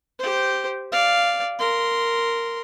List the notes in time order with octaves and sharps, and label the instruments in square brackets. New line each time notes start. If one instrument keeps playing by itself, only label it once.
[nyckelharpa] G4 C5
D5 F5
A#4 C6